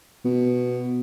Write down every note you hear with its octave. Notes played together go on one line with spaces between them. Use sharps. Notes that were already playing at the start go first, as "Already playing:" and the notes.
B2